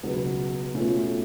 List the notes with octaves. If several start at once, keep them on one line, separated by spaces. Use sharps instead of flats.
C#2 B2 F#3 B3
B2 A3 C#4 F4